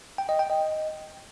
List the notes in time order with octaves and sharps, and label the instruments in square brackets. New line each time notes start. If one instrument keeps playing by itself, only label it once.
[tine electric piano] G5
D#5
G5
D#5